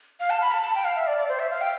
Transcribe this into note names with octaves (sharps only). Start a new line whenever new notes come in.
F5
A5
B5
A5
A5
G5
F5
E5
D5
D5
C5
E5
F5
G5